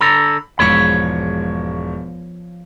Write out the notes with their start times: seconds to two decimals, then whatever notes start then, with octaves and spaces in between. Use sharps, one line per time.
0.01 D3 A4 A#5 B5
0.59 E1 G#2 F3 C#5 B5 C#6